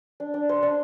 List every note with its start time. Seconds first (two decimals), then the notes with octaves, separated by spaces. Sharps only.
0.20 D4
0.34 D4
0.49 C5
0.63 D4